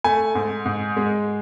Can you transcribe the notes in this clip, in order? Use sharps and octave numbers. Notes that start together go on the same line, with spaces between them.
A3 G#5
G#2
G#2
G#3